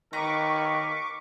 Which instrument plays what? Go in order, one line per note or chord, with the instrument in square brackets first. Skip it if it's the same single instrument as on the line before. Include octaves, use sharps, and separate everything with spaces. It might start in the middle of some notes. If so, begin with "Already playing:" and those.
[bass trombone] D#3 [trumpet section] A#4 B4 [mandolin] A#5 [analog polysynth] C#6 D6